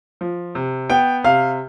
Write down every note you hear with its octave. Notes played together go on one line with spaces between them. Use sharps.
F3
C3
B3 G5
C3 F5